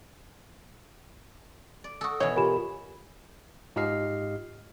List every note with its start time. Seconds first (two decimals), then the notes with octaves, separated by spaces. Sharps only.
1.84 D5
2.01 F#4 A4 C#6 D#6 E6
2.20 B2 E3 C#5
2.37 F4 G4 A#4 G#5 B5 E7
3.76 G#2 F4 G4 D#5 F6 C7